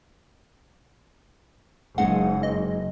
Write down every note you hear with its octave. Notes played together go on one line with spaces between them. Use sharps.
F#1 C#3 G#3 D#4 F#5
D#5